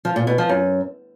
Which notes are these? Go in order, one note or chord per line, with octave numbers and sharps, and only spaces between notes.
F3
A#2
B2
F3
F#2